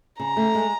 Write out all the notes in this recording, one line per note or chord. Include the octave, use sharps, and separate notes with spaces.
C#3 A#5
A3
G#3